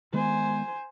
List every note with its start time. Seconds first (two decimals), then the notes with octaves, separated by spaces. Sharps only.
0.13 D#3 G#3 B3 C5 G#5